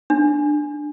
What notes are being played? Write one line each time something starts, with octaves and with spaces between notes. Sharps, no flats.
D4